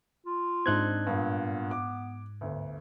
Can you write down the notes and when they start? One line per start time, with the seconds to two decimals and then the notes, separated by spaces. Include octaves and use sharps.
0.26 F4
0.66 G#2 C4 D4 D#4 F#6 G#6
1.07 G2 A#2 B3
1.71 D6
2.41 G1 D2